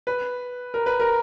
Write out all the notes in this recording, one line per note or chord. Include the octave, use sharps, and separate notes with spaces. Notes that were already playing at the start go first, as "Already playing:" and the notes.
B4
A#4
B4
A#4